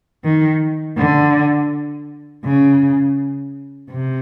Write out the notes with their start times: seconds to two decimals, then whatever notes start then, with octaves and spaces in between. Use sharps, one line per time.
0.24 D#3
0.98 D3
2.45 C#3
3.91 C3